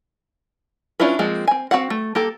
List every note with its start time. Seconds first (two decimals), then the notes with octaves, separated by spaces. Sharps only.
1.00 C#4 D4 E4 F4 B4
1.19 F3 G#3 A#3 C4
1.48 C4 G#5
1.71 C4 F#4 F5 F#5
1.90 A3
2.15 A#3 G4 A4